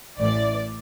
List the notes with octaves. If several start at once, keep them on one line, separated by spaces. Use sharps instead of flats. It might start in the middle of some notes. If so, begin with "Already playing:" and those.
A1 A2 E3 D5